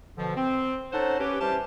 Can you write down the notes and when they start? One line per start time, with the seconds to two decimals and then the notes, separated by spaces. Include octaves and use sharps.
0.17 B2 D3 F3
0.37 C4
0.92 C#4 D#4 A4 C5 F#5 A5
1.19 C#4 G4 B4
1.41 E3 G3 C#4 G4 C5 A5